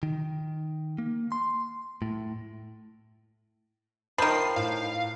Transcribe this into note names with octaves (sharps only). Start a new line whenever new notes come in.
D#3
A#3
C6
A2
D#3 F3 B5 G6 C7
A2 F5